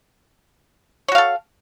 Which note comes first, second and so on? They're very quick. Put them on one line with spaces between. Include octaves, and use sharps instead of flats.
C#5 F#4 F5 A4